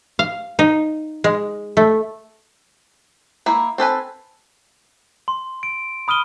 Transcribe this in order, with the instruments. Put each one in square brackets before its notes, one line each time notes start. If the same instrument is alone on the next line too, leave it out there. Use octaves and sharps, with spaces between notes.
[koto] F5
D#4
G#3
A3
[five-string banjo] A#3 E4
C4 A4 B4 G#5
[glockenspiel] C6
D7
B5 D#6 F6 D#7 G7